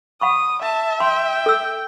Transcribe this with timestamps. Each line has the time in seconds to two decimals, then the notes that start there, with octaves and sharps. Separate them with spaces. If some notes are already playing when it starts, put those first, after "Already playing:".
0.21 F#5 B5 C#6 D#6
0.62 E5 A5
1.00 G5 C6
1.46 A4 E6